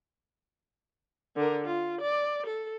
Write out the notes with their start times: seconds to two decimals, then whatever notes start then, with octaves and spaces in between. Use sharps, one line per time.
1.36 D3 A#4
1.66 F4
2.01 D5
2.46 A4